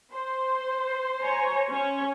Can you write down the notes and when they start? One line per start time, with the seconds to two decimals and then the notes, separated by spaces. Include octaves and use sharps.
0.12 C5
1.23 C#5 G#5 A#5
1.72 C#4 C#5